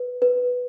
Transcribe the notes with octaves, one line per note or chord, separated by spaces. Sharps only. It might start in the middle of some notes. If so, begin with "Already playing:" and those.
Already playing: B4
B4